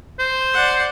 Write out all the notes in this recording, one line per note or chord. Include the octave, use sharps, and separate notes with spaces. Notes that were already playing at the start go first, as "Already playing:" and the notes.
C5
D5 F#5